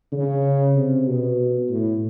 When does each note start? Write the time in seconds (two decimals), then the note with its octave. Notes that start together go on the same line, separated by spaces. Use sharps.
0.12 C#3
0.75 C3
1.07 B2
1.69 A2